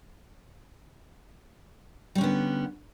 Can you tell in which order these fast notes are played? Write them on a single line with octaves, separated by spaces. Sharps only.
G3 C#4 D3 B3